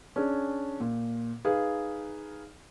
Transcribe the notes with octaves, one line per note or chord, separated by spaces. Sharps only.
C#4 D4 G#4
A#2
D#4 G#4 B4 F5